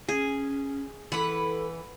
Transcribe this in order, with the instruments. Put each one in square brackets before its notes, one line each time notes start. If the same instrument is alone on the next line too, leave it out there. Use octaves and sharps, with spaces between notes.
[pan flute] C#4 [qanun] G#4
[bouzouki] E3 B4 [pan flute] A4 [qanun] F#5